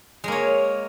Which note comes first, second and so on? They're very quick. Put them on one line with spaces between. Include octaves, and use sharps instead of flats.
G#3 A#3 C#5